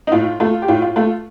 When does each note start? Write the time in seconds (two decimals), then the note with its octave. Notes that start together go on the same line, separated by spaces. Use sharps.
0.07 D#4
0.12 A2 F4
0.40 A3 F4
0.62 G4
0.68 A2 F4
0.82 F4
0.96 A3 F4